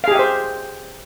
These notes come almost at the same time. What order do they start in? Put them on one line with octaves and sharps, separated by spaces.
F5 G#4 G4 E5 C5